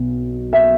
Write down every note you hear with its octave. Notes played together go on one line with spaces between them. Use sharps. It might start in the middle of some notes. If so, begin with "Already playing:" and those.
Already playing: B1 B2
E5